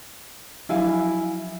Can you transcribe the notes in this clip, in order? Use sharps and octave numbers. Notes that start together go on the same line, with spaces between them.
F3 F#3 E4 F#4 F5 G#5